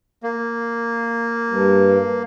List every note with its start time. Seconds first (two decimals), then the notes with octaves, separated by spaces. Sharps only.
0.23 A#3
1.48 G2